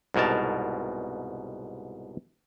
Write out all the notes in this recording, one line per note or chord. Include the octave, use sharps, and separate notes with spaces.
C2 G#2 B2 A#4 A5